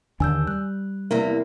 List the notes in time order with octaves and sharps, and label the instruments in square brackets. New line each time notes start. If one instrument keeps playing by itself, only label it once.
[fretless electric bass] D#2 D3 D4 [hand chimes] G#5 E6 G6
[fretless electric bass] G3 [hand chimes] F#6
[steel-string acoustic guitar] E2 C3 A#3